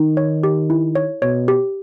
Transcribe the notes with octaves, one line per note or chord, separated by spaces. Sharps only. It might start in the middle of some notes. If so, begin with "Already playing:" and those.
Already playing: D#3 D#4
C#5
G4
E4
C#5
B2 C#5
G4